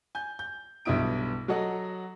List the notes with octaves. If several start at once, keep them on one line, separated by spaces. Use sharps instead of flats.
G#5 G6
G6
B1 G2 B3 E4 D#6 D7
F#3 F#4 A4 D#5 F#5